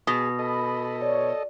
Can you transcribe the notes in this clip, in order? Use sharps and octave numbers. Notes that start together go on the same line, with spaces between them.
B2 G#4 D#6
A4 D#5 B5
C#5 D5